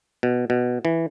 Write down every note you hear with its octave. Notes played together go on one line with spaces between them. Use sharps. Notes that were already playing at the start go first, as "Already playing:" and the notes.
B2
B2
E3